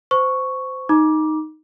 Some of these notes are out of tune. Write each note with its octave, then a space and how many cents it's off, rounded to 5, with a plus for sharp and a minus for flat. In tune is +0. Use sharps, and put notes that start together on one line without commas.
C5 -20 C#6 +0
D#4 +0 A#5 +40 D6 +0